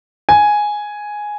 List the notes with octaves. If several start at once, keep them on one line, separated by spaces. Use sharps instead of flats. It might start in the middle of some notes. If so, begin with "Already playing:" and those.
G#5